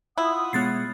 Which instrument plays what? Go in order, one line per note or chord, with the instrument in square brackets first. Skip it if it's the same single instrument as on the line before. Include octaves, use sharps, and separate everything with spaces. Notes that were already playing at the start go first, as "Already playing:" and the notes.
[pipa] E4 [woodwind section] F4 F#5 D#6
[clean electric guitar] B2 G#3 C#5 [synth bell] B3 A6 C7